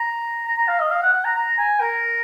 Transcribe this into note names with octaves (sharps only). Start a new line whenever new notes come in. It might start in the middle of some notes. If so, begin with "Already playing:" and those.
Already playing: A#5
A#5
A#5
F5
D#5
F5
F#5
F#5
A#5
A#5
G#5
A#4